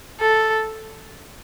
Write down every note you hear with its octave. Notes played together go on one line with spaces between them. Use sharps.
A4